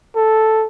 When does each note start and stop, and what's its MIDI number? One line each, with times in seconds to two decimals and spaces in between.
0.16 0.67 69